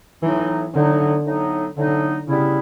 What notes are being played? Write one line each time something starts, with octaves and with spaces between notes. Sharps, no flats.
A2 E3 F#3 B3 D#4
A2 D3 F#3 B3 D#4
A2 F#3 B3 D#4
A2 D3 F#3 B3 D#4
C#3 G3 B3 E4